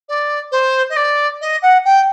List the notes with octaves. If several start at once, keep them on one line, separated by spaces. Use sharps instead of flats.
D5
C5
D#5
D5
D#5
F#5
G5